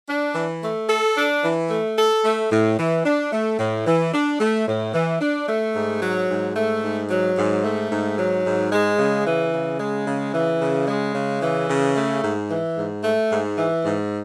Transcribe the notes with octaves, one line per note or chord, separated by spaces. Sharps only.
D4
E3
A3
A4
D4
E3
A3
A4
A3
A2
E3
D4
A3
A2
E3
D4
A3
A2
E3
D4
A3
G#2
F#3
G#2
A3
G#2
F#3
G#2
A3
G#2
F#3
G#2
G#3
C#3
E3
C#3
G#3
C#3
E3
C#3
G#3
C#3
E3
C#3
A3
G#2
E3
G#2
A3
G#2
E3
G#2